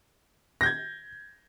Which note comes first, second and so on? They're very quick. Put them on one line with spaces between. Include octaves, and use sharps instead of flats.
A#6 G6 G#6